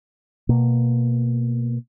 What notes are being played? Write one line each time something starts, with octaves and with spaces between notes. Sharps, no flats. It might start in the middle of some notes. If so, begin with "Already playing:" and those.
B2 A#3